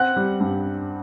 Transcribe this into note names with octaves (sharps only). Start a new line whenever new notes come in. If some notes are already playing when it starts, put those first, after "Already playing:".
Already playing: C4 F#5 F#6
G3
G2